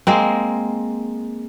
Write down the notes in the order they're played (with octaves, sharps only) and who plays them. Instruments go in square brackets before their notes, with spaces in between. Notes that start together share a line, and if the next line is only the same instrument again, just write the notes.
[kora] G#3 A#3 C4